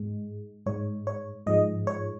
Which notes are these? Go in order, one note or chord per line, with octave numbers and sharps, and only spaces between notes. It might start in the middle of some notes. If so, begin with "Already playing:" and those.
Already playing: G#2 G#3
G#2 G#3 C#5
C#5
G#2 F3 G#3 D#5
C#5